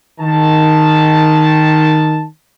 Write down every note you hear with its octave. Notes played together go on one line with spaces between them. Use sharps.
D#3 A5